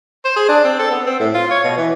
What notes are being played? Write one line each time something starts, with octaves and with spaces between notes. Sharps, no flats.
C5
G#4
D4
C4
A4
B3
C4
A2
F4
C#5
B2
E3